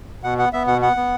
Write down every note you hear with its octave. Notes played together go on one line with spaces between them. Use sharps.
B2 F#5
B3 F#5
B3 E5
B2 F#5
B3 F#5
B3